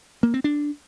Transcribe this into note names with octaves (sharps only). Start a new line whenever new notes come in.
A#3
C4
D4